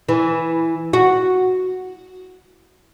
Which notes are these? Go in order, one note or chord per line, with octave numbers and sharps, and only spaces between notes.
E3
F#4